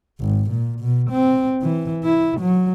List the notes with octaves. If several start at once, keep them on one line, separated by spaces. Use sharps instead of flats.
G#1
A#2
B2
C4
E3
E4
F#3